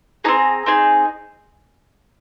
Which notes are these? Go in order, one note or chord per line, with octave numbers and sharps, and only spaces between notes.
C4 D#4 G#4 A#5
C4 D#4 G#4